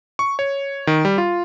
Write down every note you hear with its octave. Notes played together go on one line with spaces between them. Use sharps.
C#6
C#5
D#3
G3
F4